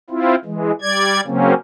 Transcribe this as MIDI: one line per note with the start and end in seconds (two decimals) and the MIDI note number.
0.10 0.35 60
0.10 0.35 64
0.10 0.35 65
0.45 0.72 52
0.45 0.72 56
0.82 1.21 55
0.82 1.21 74
0.82 1.21 92
1.26 1.54 49
1.26 1.54 54
1.26 1.54 58
1.26 1.54 60
1.26 1.54 61